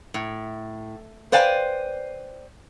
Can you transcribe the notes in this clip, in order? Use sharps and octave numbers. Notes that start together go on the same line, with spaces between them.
A2
B4 C5 D5 F5 G5 G#5